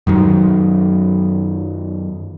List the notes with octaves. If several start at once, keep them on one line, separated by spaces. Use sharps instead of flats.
F#2 D#3 F#3